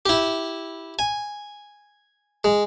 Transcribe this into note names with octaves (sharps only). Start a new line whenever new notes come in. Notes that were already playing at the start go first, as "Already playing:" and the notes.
E4 G4
G#5
G#3